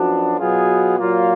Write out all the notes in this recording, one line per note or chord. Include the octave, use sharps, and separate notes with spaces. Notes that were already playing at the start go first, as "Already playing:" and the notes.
Already playing: F#2 F3 B3 D4 F#4
B2 F#3 B3 F4 G#4
A#2 F#3 A#3 F4